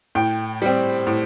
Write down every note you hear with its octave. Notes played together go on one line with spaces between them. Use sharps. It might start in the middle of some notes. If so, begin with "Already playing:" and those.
A2 G5
G3 C4
A2